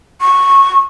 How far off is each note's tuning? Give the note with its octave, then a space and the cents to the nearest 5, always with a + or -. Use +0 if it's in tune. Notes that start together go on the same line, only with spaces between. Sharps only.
C#6 -10